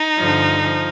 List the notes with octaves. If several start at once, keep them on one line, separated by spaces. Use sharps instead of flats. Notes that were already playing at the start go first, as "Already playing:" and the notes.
Already playing: D#4
G2 D3 F3
F3